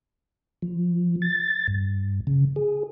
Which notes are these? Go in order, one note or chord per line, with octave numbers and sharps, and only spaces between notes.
F3
A6
G2
C#3
G#4